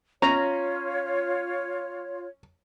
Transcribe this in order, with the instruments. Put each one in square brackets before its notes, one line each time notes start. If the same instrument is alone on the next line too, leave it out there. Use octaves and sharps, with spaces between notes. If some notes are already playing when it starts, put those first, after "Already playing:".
[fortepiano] C#4 [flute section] F4 C#5 [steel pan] A#5